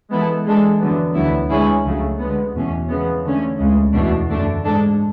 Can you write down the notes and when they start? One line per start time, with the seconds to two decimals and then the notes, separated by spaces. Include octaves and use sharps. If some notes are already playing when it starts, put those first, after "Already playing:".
0.10 E3 G#3 B3 E4 A4
0.45 E3 G#3 D4 A4
0.80 E2 D3 F#3 B3
1.14 D2 D3 F#3 B3 E4
1.49 D3 G#3 C#4 E4 G#4
1.84 C#2 C#3 F#3 A3
2.18 D3 G#3 B3
2.54 E2 B2 A3 C#4
2.88 C#3 E3 G#3 B3
3.24 D3 A3 C#4
3.58 D2 C#3 G#3
3.93 E2 B2 A3 D4
4.27 F#2 D3 A3 D4
4.63 G#2 G#3 D4 A4